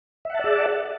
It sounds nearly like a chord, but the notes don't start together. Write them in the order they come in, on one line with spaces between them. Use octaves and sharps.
E5 F#5 A5 D5 G#4